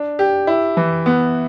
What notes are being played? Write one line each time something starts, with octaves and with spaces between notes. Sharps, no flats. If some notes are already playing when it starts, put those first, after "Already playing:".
Already playing: D4
G4
E4
E3
B3